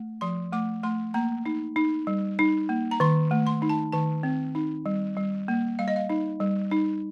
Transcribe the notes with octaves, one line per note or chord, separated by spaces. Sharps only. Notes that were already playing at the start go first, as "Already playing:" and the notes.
Already playing: A3
F3 C6
A3 D6
A3 C6
A#3 A#5
D#4
D#4
G3
D#4
A#3
A#5
D#3 C6
A3
C6
D#4
A5
D#3 A5
C4
D#4
G3
G3
A#3
G3 F5
D#5
F5
D#4
G3
D#4